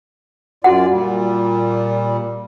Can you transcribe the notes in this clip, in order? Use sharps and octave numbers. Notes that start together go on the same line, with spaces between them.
F#2 F4 F#4 D5 F#5
A#2 G3